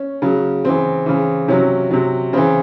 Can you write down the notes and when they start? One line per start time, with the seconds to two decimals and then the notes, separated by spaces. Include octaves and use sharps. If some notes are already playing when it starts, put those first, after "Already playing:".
Already playing: C#4
0.22 C#3 F#3
0.64 C#3 E3 C4
1.06 C#3 E3
1.48 C3 F#3 C#4
1.91 C3 F#3
2.33 C#3 E3 C4